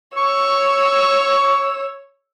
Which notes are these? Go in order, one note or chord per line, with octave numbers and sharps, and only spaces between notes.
C#5 C#6 E6